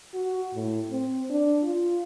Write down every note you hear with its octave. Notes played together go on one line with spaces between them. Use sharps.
F#4
A2
C4
D4
F4